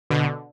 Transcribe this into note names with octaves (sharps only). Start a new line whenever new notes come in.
B2 D3